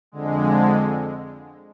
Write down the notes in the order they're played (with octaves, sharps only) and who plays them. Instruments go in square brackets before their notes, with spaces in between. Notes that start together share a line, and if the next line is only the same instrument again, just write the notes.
[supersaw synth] F2 D3 G#3